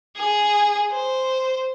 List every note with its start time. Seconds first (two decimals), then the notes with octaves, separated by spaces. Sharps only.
0.16 G#4
0.92 C5